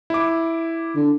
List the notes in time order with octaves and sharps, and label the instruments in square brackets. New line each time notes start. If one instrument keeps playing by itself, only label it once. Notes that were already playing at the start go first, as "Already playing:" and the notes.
[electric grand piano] E4 D6
[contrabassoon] D3